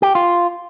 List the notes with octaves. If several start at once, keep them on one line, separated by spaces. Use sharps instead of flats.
G4
F4